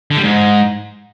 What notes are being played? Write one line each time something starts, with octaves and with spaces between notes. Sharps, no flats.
D3
G3
G#2